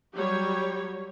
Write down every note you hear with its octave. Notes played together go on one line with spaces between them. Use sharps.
F#3 G3 G4 C#5